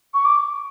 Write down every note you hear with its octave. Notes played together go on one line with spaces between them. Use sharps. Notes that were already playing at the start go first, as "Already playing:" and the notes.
C#6
D6